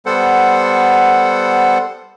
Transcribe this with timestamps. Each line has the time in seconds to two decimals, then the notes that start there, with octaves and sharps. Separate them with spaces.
0.06 G3 B3 A4 C5 F#5